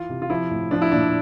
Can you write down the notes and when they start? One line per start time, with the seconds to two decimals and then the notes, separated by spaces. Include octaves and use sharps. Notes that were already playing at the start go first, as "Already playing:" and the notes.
Already playing: E3 F4
0.10 C3
0.22 F4
0.30 F3 E4
0.51 A2
0.71 F3 D4
0.82 E4
0.92 A#2 D4